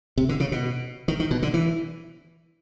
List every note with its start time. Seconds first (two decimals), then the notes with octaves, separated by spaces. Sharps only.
0.18 C3
0.29 D3
0.40 C#3
0.52 B2
1.08 D#3
1.20 D#3
1.31 B2
1.43 D3
1.54 E3